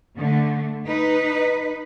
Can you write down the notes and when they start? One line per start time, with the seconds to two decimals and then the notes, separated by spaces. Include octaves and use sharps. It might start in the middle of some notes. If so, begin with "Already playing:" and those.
0.16 D3 A3
0.86 D#4 B4